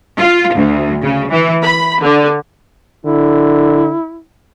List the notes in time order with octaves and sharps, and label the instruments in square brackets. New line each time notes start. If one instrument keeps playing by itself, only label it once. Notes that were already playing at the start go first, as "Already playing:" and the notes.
[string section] F4
D2
C#3
E3
B5
D3
[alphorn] D3 [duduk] E4